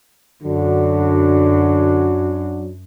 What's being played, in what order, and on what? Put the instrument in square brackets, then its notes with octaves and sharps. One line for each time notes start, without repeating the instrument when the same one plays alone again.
[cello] F#2 [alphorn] D3 [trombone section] F#3 D4 F#4